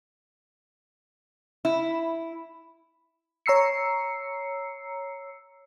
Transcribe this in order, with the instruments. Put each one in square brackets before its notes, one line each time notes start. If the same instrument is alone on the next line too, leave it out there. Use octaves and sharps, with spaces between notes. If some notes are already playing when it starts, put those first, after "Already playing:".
[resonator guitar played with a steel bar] E4
[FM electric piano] C#5 A#5 E6 C7 C#7